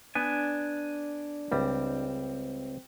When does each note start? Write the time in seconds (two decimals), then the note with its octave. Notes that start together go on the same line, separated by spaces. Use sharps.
0.15 B3 D4 G#5
1.52 C#2 G3 C4